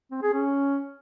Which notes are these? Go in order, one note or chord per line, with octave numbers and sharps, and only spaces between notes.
C4
G#4
C#4